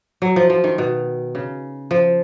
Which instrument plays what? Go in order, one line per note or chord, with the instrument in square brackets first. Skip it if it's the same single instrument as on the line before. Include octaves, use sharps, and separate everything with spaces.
[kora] F#3
F3
F3
D#3
B2
C#3
F3